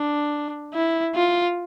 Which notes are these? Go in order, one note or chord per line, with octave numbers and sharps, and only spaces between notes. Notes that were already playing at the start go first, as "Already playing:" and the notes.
Already playing: D4
E4
F4